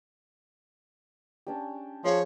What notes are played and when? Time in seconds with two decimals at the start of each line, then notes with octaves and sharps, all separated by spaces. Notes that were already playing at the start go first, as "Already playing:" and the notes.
1.47 C#4 D4 G4
2.04 F3 G#4 C5 C#5 F5